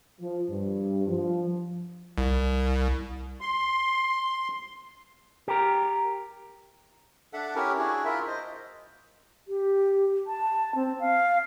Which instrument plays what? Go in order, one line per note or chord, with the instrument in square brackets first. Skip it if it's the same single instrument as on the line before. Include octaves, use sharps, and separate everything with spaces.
[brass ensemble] F3
G2
F3
[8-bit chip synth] C2
[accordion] C6
[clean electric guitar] G4 A#4
[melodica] D4 A4 E5 F#5
C#4 E4 G4 A#4
D4 E4 F#4 G#4
E4 F4 A#4 E5
C5 D#5
[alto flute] G4
A5
C4
F5